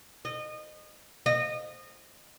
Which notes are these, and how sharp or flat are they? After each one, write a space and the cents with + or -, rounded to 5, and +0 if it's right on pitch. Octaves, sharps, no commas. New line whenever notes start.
D#5 -25
D#5 -20